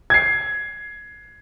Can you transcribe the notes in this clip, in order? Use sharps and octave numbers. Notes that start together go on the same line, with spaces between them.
G#6 C7